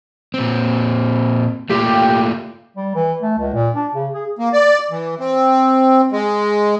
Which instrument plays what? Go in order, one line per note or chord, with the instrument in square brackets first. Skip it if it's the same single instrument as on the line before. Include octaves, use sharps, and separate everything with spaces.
[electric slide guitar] A#2 C4
[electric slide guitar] A3 A#3 F4 [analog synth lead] G4
[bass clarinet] G3
E3
A3
C#2
A#2
D4
C#3
G#4
[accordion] A#3
D5
E3
C4
G#3